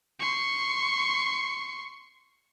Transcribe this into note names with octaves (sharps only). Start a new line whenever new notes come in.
C6 C#6